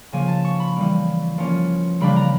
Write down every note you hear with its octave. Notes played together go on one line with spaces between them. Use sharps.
C#3 F3 A#3 G#5
A5
C#6
B5
E3 G3 A#3
F3 A#3 C#4
C#3 E3 G3 A#3 D4 B5
A#5